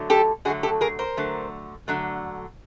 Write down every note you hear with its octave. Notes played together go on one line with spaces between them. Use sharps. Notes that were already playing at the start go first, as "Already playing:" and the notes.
Already playing: D3 F#3 A3
G4 A4
D3 F#3 A3 F#4 G#4
G4 A4
G#4 A#4
A#4 C5
D3 F#3 A3
D3 F#3 A3